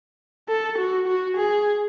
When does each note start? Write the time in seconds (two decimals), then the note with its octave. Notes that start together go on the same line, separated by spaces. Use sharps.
0.49 A4
0.78 F#4
1.07 F#4
1.37 G#4